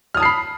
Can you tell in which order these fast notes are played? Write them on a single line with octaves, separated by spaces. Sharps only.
F6 D#6 A5 C7 B5